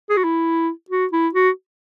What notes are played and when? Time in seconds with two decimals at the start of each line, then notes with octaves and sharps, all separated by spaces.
0.10 G#4
0.17 F#4
0.24 E4
0.90 F#4
1.12 E4
1.34 F#4